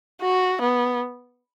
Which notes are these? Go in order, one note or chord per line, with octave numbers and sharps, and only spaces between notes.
F#4
B3